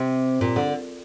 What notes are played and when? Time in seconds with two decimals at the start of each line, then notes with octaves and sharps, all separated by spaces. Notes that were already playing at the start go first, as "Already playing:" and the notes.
Already playing: C3
0.41 A#2
0.56 D3